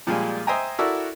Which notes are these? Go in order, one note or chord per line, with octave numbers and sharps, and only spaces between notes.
A#2 F3 G3 G#3 F4 G#5
C5 D#5 E5 G5 G#5 A#5
E4 F#4 A4 A#4 D5 E5